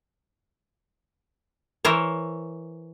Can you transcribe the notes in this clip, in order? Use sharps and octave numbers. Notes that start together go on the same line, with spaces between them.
E3 E4 A#4 C5 C#5